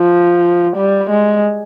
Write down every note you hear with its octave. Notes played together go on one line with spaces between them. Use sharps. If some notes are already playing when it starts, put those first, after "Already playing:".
Already playing: F3
G3
G#3